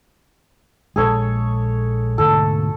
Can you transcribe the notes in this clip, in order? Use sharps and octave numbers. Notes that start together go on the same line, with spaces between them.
A#1 G#3 G#4 A4 C#5
D2 G#2 B2 A4